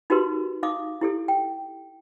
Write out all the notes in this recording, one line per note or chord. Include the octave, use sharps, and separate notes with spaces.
D#4 F#4 G4 A#4 B4 C6
D#4 F5 D6 D#6
E4 G4 A4
G5